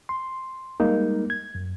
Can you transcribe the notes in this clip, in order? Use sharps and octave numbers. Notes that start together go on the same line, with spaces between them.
C6
G3 G#3 A#3 D#4
G#6
F#2